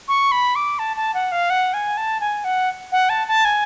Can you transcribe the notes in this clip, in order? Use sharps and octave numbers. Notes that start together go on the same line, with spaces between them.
C#6
B5
D6
A5
A5
F#5
F5
F#5
G#5
A5
G#5
F#5
F#5
A5
A5
G#5